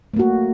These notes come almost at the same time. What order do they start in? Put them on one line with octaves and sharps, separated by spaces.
A3 A#3 F#4